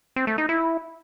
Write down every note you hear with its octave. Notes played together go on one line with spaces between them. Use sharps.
C4
A3
D#4
E4